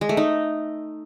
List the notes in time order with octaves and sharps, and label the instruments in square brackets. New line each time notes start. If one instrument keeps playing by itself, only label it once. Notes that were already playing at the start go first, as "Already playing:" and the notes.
[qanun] G#3
A3
D#4